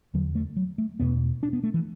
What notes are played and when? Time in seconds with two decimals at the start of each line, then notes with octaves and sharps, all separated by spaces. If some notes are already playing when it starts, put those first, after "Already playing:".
0.14 E2 D3 F#3
0.35 A3
0.57 F#3
0.78 A3
1.00 E2 B2 B3
1.43 D4
1.53 B3
1.63 A3
1.74 E3